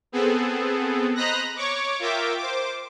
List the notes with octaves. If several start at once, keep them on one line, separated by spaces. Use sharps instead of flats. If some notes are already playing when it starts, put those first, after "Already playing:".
B3 C4 G#4 A4
C5 D#5 A#5 B5 F#6 A#6
C#5 C#6 D6
F4 A#4 E5 G5 D6
C5 D6